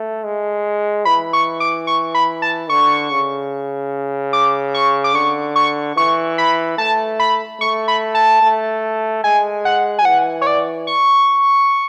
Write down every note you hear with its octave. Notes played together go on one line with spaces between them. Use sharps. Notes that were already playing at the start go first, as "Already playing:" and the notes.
Already playing: A3
G#3
E3 B5
C#6
D6
C#6
B5
A5
D3 C#6
C#3
D6
C#6
D6
D3 C#6
C#6
E3 C#6
B5
A3 A5
B5
A3 C#6
B5
A5
A3
G#3 G#5
F#5
G#5
E3 F#5
C#5
D5
C#6